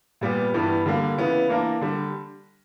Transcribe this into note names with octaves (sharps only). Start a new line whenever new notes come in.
A#2 G3 B3
G2 E3 G3 B3
D3 G3 A#3
C#3 E3 B3
E3 A#3 D4 A#4
D3 G3